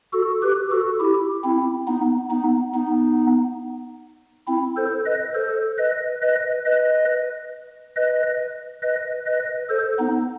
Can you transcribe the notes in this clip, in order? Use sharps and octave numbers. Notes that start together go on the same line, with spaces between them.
F#4 A4
G4 B4
F#4 A4
E4 G4
C4 E4
B3 D#4
B3 D#4
B3 D#4
C4 E4
A4 C5
B4 D#5
A4 C5
B4 D#5
B4 D#5
B4 D#5
B4 D#5
B4 D#5
B4 D#5
A4 C5
B3 D#4